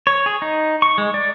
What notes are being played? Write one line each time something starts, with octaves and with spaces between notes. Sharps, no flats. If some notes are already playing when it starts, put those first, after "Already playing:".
C#5
G#4
D#4
C#6
G#3
D5